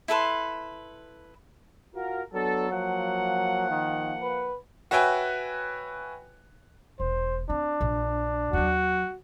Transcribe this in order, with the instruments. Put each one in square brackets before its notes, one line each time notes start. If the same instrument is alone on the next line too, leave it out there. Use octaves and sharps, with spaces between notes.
[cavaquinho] E4 A4 B4 C6
[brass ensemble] F4 F#4 A#4
[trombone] F#3 [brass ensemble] B3 D4 A4
[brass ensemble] F3 A#3 F#5
[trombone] D#3
B4
[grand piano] F#4 B4 C#5 E5 G5 G#5
[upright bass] E1 [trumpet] C5
[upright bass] C4 [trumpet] D4
[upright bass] A#1
[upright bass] D#2 F#3 [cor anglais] F#4